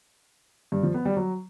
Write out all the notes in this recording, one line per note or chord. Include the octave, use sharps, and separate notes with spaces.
G2
F3
B3
G3
F#3